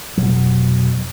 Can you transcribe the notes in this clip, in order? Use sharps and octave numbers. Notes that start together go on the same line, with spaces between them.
F1 B2 F#3